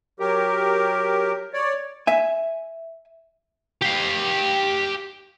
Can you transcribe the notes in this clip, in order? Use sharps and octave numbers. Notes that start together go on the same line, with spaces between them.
F#3 G4 A#4
C#5 D5
E5 G#5
G4 F5